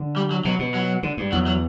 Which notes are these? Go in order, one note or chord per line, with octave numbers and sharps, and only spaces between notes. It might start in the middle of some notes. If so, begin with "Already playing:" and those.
Already playing: D3
G3
F#3
B2 F#3
B2
F#3
D3
G2
E2 F#3
F#3